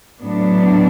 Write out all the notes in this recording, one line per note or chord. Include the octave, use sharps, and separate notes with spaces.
A2 F#3 B3 D4